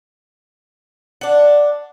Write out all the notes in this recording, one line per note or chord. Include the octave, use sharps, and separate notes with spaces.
D4 F#5